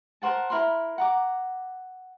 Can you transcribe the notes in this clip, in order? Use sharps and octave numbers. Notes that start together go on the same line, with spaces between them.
A#4 C5 F#5 A5
E4 A#4 B5 C6
F#5 A#5 D6